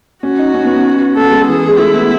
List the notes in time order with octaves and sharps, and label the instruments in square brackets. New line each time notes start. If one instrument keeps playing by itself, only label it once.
[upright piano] C#4 [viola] F#4
[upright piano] D#4
C#4
B3
C#4
[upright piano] B3 [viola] A4
[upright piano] G#3
[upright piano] E3 [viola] G#4
[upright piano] G#3
[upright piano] A3 [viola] E4
[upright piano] B3